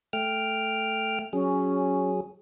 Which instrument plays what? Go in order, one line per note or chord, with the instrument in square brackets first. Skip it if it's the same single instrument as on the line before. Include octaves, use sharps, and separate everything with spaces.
[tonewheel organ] A3 G5 F6
[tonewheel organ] F#3 G#4 [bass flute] C#4